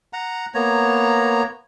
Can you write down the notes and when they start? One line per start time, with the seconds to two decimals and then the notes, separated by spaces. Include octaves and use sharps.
0.13 F#5 A#5
0.55 A#3 B3 C#5 A#5